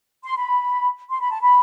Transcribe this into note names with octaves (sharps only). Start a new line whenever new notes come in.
C6
B5
C6
B5
A5
B5